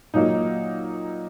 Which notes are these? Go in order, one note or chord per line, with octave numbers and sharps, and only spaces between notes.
A#2 F#3 A#3 D#4